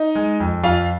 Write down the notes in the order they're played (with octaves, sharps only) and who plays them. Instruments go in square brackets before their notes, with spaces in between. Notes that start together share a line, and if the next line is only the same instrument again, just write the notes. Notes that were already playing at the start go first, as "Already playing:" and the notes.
Already playing: [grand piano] D#4 D#5
G#3
F2
F2 F4 F5